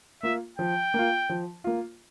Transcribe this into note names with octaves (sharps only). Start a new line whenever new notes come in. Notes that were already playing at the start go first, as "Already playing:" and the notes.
A#3 F4 E5
F3 G5
A#3 F4
F3
A#3 F4